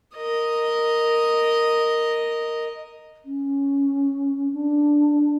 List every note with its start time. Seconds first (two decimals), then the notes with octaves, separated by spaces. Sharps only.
0.16 A#4 D#5
3.25 C#4
4.53 D4